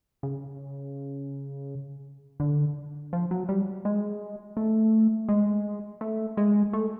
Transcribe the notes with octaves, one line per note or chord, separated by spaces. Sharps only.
C#3
D3
F3
F#3
G3
G#3
A3
G#3
A3
G#3
A3